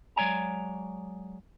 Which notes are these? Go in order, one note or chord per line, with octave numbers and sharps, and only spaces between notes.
F#3 G#3 C#5 D5 G#5 A#5